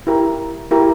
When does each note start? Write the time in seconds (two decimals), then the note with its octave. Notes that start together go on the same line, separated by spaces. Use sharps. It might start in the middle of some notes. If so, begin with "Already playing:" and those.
0.07 E4 G4 A#4
0.71 E4 G4 A#4